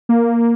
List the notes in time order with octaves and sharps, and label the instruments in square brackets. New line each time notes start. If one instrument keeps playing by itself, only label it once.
[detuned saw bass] A#3